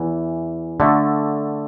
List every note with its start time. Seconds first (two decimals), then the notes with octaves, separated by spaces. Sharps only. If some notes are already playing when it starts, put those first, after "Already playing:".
Already playing: E2 E3
0.80 D3 A3 F#4